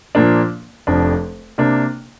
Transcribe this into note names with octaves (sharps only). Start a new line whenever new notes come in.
A#2 F3 A#3 D4
F1 F2 F3 D4
C3 A#3 D4